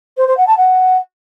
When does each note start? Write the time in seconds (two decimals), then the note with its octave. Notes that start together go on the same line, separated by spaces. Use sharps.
0.17 C5
0.27 C5
0.37 F#5
0.47 A5
0.57 F#5